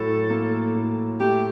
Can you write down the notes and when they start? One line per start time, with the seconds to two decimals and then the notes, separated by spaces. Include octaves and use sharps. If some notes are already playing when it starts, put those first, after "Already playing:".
Already playing: A2 F#3 A4
0.30 A#3
0.75 A2
1.20 A3 G4